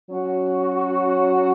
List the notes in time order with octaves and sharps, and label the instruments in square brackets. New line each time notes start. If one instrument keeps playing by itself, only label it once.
[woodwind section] F#3 C#4 F#4